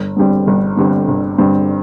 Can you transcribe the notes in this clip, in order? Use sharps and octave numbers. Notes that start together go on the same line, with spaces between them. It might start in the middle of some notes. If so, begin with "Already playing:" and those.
Already playing: G1
G2 D3 G3 C4
G1
G2 D3 G3 C4
G1
G2 D3 G3 C4